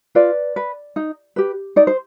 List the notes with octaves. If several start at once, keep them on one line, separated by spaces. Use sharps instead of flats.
F4 B4 D5
B4
D#4
G4 B4
D#4 D5
C5